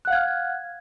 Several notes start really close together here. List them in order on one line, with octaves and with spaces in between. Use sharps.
F#6 F#5 F5 G#6 F6